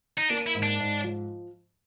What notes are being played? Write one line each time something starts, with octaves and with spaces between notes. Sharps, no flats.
D#4
A#3 D4
E4
G#2
D4
G#2
F3